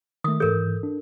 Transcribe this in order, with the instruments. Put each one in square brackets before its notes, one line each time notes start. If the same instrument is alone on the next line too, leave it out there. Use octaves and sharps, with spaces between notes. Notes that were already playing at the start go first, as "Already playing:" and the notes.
[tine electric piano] D#3 A3 [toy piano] D#6
[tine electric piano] G#2 E3 G6 [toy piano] A4 A#4
[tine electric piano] D4